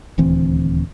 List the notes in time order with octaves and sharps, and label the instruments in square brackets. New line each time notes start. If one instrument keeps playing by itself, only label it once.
[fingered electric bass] D#1 D2 E3 C4